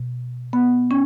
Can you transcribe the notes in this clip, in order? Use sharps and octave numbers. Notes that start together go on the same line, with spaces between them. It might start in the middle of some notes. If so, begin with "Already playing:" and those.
Already playing: B2
B3
C#4